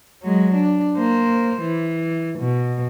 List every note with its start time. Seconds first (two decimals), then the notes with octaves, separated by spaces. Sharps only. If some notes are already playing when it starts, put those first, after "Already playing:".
0.23 F#3 G#3
0.55 D4
0.98 A#3 C5
1.62 E3
2.40 B2